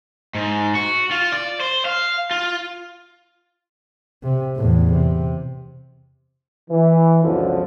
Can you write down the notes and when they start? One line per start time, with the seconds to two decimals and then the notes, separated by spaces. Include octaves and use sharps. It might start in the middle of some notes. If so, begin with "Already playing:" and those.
0.35 G#2
0.75 F#4
1.11 F4
1.32 D5
1.60 C5
1.85 F5
2.31 F4
4.23 C3
4.57 E2 A2
4.93 C3
6.70 E3
7.22 C#2 F#2 B2 D3 F3 A4